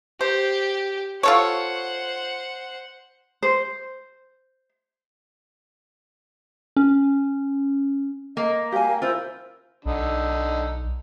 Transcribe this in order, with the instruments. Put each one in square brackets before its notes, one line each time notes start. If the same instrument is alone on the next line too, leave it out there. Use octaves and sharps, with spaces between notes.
[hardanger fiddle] G4 [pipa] C5
[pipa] F4 A4 C#5 [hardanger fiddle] C5 F#5
[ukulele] C5
[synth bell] C#4
[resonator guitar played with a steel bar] A#3 [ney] D#5
[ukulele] G4 G#5 [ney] F5
[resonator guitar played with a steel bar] E4 F4 [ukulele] A#4 [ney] C5
[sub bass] B1 [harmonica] D3 D#4